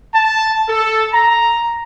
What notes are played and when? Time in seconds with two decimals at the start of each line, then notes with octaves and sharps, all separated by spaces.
0.15 A5
0.68 A4
1.13 A#5